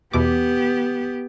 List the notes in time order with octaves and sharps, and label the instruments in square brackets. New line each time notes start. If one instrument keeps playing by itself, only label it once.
[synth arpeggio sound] E2 B2 D6 [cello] B3 G4